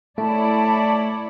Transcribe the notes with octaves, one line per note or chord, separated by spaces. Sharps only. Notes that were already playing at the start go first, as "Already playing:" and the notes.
A3 E4 C#5 D5 A5